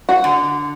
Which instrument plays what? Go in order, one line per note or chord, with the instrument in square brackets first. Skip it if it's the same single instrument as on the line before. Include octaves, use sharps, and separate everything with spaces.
[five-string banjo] F#4
[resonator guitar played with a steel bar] D3